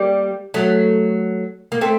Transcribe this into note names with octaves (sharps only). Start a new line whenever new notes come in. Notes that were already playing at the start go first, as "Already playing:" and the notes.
Already playing: G3 A#3
F#3 A3
A#3
A3 C4